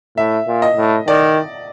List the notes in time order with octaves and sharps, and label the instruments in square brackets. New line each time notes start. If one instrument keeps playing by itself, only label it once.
[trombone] A2 [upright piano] E5
[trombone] A#2
[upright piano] D#5
[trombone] A2
[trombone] D#3 [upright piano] D5